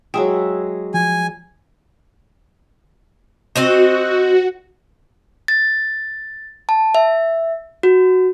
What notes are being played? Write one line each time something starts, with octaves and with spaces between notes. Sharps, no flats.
F#3 G#3 E5 G5 D#6
F3 G#5
C4 F#4 C5 D#5
A6
A5
E5
F#4